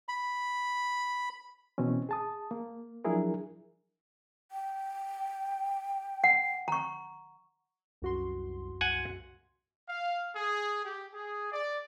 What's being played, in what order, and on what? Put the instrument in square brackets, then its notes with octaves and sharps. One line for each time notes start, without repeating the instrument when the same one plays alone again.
[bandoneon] B5
[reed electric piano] B2 E3 C4 C#4
G#4 A5 D#6
A#3
F3 F#3 D4 E4 G#4 A#4
[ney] G5
[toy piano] F#5
A#5 C#6
[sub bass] C2 [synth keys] F#2 F#4 C6
[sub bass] C2 [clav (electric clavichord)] F#5 G#5
[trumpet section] F5
G#4
G4
G#4
D5